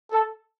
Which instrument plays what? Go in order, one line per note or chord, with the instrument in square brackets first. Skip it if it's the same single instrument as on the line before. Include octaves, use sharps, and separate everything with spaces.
[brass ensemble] A4